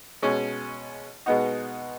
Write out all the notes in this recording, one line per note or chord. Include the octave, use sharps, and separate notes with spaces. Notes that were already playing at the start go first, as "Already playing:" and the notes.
B2 G#3 C#4
B2 G#3 B3 D#4 F#4